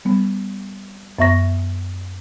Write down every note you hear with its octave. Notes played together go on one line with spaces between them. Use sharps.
G3 B3
F#2 B3 E5 C#6 A#6